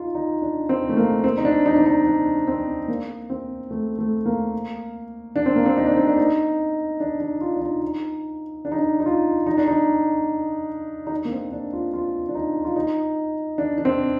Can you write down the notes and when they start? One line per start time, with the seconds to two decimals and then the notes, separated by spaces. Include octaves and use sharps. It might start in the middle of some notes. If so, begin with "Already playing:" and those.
Already playing: D#4 F4
0.15 D#4
0.42 D4
0.69 C4
0.89 A3
0.97 A#3
1.24 C4
1.38 D#4
1.45 D4
1.66 D#4
1.77 D4
1.86 D#4
2.06 D4
2.48 C4
2.88 A#3
3.30 C4
3.71 A3
3.98 A3
4.26 A#3
5.36 D4
5.46 C4
5.56 A#3
5.66 C4
5.77 D#4
5.87 D4
5.97 C4
6.07 D4
6.17 D#4
7.00 D4
7.20 D#4
7.41 F4
7.56 D4
7.62 D#4
7.83 D#4
8.65 D4
8.72 D#4
8.79 D4
9.00 D#4
9.06 F4
9.46 D#4
9.57 D4
9.68 D#4
11.07 D#4
11.11 D4
11.25 A#3
11.32 C4
11.52 D4
11.73 F4
11.93 F4
12.28 D4
12.35 D#4
12.65 F4
12.76 D#4
13.58 D4
13.78 D4
13.85 C4